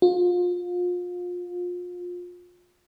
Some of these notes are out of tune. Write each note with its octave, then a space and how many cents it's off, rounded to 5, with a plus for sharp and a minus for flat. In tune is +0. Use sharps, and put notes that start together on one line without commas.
F4 +30